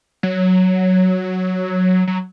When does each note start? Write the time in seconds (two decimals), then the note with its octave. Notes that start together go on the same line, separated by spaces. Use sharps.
0.23 F#3
2.07 F#3